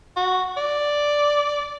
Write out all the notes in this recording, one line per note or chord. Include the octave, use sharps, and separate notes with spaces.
F#4
D5